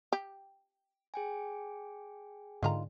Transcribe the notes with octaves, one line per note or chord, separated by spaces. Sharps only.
G4
G#4 G5 G#5
G#2 D3 D#3 F4 A#5